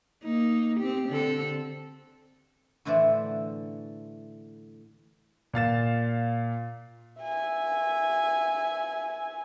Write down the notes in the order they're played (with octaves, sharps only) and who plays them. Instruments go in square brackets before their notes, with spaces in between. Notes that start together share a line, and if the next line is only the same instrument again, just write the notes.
[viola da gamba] A#3 D#4
C4 G4
D3 C4 A4
[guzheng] A2 D3 E3 C5 D5 F#5
[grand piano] A#2 F5 A6 E7
[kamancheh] E5 G#5